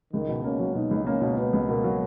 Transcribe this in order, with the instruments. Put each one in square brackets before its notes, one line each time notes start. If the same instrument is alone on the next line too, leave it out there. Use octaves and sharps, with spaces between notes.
[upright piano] C#2 [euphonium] D#3
[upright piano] B2
[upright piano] A#3 [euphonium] C#4
[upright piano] F#3
[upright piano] B2 [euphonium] D#4
[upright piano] C#2
[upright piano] A#3 [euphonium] C#4
[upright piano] B2
[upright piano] B2 [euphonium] B3
[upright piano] C#2
[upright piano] B2 [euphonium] A#3
[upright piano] F#3